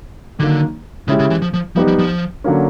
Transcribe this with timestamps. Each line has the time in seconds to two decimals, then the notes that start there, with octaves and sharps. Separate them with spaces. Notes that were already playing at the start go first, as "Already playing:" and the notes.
0.39 D3 D#3 F#3 A#3
1.08 C#3 G#3 C#4 E4 G4
1.19 C#3
1.31 E3
1.42 F3
1.54 F3
1.76 F3 G3 B3 D#4 G4
1.88 F3
1.99 F3
2.44 D3 F#3 A#3 C#4